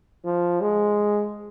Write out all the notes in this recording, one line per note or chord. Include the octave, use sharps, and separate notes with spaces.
F3
G#3